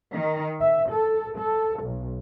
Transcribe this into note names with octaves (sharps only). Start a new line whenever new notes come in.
D#3
E5
A4
A4
B1